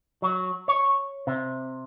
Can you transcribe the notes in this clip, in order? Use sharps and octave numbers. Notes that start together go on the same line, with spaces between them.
F#3
C#5
C3